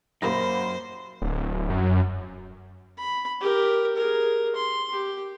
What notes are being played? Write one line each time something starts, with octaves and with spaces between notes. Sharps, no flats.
F#2 D#3 A#3 G4 A#4 C5 B5 A#6
D1
F#2
B5
G4 A#4
G#4 A#4
C6
G4